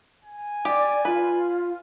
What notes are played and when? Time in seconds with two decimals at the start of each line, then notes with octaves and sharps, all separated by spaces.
0.23 G#5
0.65 G4 D5
1.05 F4 B4